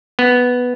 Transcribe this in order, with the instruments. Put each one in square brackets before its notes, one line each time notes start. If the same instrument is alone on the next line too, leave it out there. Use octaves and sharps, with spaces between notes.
[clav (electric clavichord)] B3